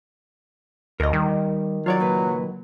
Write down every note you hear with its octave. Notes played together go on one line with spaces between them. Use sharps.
D2 A#4 D#5
D#3 G3
F#3 F4 C#5 D5
C#2 A#2 B4